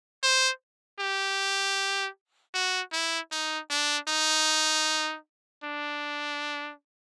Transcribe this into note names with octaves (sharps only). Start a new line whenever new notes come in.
C5
G4
F#4
E4
D#4
D4
D#4
D4